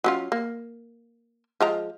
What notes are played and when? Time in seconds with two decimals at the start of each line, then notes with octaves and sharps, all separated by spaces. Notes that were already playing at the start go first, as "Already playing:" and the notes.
0.04 F#3 C#4 F4
0.32 A#3
1.60 F3 G#3 A#5